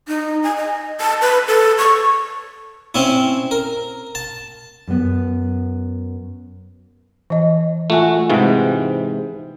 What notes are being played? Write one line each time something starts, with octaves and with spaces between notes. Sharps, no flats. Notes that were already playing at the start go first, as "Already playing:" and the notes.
D#4
G#5
D#5
A5
B4
A4
C#6
C4 C#4 E4
A#4
A5
F#2 B3
E3 D#5
A3 F4 F#4 E5 G#5
G#2 C3 E3 F5 F#5